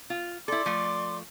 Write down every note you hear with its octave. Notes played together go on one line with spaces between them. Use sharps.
F4
E4 A4 D5 C6 D6
F3 A3